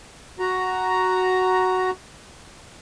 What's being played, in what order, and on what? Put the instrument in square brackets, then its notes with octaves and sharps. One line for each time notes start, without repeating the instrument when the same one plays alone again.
[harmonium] F#4 A#5